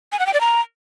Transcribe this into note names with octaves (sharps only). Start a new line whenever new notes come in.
G#5
F#5
G5
D5
A#5